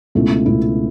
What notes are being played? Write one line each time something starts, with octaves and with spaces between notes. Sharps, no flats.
C#2 B2 A3 E4
C#2 B2 A3 E4